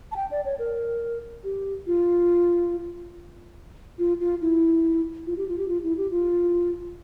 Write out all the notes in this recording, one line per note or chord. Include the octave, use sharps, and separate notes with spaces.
A5
G5
D5
C#5
A#4
G4
F4
F4
F4
E4
F4
G4
F4
G4
F4
E4
G4
F4